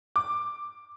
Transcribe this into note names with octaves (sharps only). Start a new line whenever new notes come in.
D6